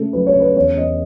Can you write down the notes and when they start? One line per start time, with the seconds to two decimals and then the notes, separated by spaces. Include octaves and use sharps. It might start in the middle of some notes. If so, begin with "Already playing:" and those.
Already playing: C#3 A3 A4
0.13 F#3 B4
0.27 C#5
0.35 C#3 B4
0.56 E2 C#5
0.77 E2 D#5